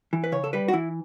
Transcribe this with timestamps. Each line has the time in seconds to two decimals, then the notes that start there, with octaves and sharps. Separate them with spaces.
0.13 E3
0.24 B4
0.32 C#3 C#5
0.44 A4
0.53 G3 B4
0.68 F#4
0.73 E3 E4